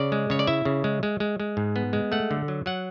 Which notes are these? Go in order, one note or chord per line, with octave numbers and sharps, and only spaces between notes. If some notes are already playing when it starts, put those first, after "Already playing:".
Already playing: C#3 D5
G#3
C#3 C#5
D5
E4 E5
C#3
G#3
G#3
G#3
G#3
G#2
B3
G#3
A3 F#5
D3
F#3
F#3 F#5